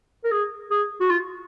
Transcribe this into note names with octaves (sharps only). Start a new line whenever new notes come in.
A#4
G#4
G#4
F#4
F4